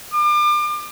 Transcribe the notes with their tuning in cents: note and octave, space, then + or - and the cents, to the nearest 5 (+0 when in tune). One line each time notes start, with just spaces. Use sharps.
D6 +35